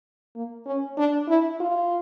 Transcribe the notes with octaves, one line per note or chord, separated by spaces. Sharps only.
A#3
C#4
D4
E4
F4